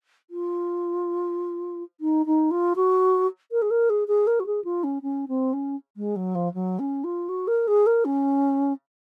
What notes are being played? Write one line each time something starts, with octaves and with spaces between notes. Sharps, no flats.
F4
D#4
D#4
F4
F#4
A#4
G#4
A#4
G#4
G#4
A#4
F#4
G#4
F4
C#4
C#4
C4
C#4
G#3
F#3
F3
F#3
C#4
F4
F#4
A#4
G#4
A#4
C#4